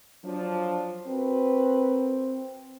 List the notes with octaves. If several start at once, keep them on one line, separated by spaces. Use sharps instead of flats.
F3 F#3 D4
C4 F#4 A#4 B4